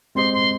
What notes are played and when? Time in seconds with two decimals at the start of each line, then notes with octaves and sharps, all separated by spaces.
0.15 G#3 C4 G4 C5 D#5 C6
0.34 C6